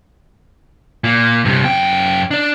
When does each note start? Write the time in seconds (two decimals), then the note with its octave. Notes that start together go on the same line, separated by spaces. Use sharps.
1.04 A#2
1.45 G2 C3
1.64 F#2 G5
2.31 D4 D5